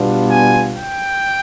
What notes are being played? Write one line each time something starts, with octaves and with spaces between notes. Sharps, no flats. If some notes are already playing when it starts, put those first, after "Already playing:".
Already playing: B2 G3 B3 D4 F4
G#5
G5